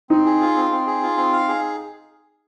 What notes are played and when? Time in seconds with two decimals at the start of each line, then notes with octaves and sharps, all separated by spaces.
0.10 C4 D#4
0.25 G#4
0.41 F4
0.56 C4
0.71 C4
0.87 G#4
1.03 F4
1.17 C4
1.33 F5
1.48 G#4